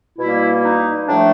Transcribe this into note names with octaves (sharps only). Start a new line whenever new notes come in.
B2 G3 A#3 E4
D#4
A2 F3 A3 D4